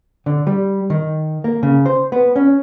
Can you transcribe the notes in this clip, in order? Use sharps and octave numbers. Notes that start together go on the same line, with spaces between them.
D3
G3
D#3
A#3
C#3
C5
B3
C#4